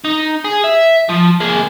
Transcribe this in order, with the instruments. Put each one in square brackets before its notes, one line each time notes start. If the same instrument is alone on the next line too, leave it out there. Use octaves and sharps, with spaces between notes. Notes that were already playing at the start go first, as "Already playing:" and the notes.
[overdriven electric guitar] D#4
G#4
E5
F3
A#3 G#4